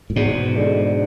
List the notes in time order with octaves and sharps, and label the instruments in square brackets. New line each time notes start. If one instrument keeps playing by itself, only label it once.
[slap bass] A2
[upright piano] E2 [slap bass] G#2 B2
[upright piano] D3 G#3 D4